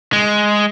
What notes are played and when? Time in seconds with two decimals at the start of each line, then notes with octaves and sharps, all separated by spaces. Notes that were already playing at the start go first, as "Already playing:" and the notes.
0.13 G#3